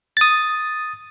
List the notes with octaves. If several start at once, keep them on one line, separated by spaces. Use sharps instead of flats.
D#6 A6